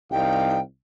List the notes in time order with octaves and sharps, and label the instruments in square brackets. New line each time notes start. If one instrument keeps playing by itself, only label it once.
[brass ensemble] C2 D#4 F5 [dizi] G5